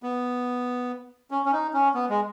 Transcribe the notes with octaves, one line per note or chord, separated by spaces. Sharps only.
B3
C#4
C#4
D#4
C#4
B3
G#3